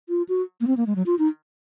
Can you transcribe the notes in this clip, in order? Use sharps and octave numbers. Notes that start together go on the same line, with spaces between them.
F4
F#4
A#3
C4
A#3
G#3
F#3
F4
D#4